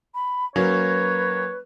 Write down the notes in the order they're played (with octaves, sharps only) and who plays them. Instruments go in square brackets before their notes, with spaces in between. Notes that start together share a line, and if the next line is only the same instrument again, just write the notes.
[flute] B5
[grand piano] F#3 A#3 C#4 [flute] B4 [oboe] C#5